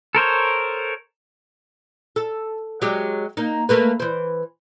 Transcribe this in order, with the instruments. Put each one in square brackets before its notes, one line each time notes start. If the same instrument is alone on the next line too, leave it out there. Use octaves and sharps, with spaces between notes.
[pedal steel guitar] A4 A#4 C5 C#5
[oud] A4
F#3 G#3 G4
A#3 D#4
A3 A#3 B4
E3 C5